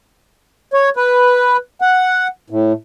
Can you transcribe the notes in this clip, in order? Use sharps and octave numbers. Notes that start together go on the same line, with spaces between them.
C#5
B4
F#5
A2